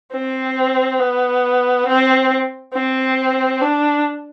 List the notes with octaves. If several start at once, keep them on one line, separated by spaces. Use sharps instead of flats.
C4
B3
C4
C4
D4